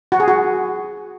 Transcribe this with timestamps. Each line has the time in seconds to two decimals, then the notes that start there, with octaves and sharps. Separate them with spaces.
0.12 F#4
0.20 G#4
0.28 F#4